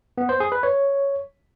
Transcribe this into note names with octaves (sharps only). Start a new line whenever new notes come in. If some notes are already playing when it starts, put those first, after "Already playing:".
B3
C5
G#4
B4
C#5